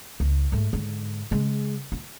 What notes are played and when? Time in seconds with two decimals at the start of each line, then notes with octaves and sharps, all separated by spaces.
0.20 C#2
0.52 G#2 A3
0.73 G#2 D3
1.31 C#3 G#3
1.92 F4